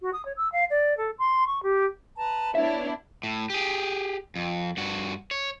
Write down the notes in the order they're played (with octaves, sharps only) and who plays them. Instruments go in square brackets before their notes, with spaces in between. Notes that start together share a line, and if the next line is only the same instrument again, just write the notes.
[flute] F#4
D#6
C#5
E6
F5
D5
A4
C6
C#6
G4
[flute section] B4 A5 A#5
[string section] B3 D4 E4 [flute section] C#5 [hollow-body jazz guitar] E5
[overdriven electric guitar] A2
G4 G#4
F2
G2 F#4
C#5